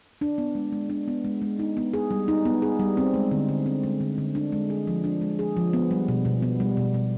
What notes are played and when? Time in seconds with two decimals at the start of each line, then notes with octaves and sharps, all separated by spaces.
0.21 D4
0.38 B3
0.55 G#3
0.72 G#3
0.90 D4
1.08 B3
1.25 G#3
1.42 G#3
1.59 D#4
1.77 B3
1.94 G#4
2.11 G3
2.28 D#4
2.45 B3
2.62 G#4
2.79 G3
2.97 C4
3.14 G#3
3.32 D3
3.49 D3
3.66 C4
3.83 G#3
4.01 D3
4.18 D3
4.35 D4
4.52 G#3
4.70 G#4
4.87 F3
5.04 D4
5.21 G#3
5.39 G#4
5.57 F3
5.73 B3
5.91 G3
6.08 B2
6.25 B2
6.42 B3
6.60 G3
6.77 B2
6.94 B2